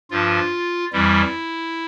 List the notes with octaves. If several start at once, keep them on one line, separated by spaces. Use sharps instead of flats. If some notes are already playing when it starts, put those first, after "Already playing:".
G2 F3 F4
F2 E3 G3 E4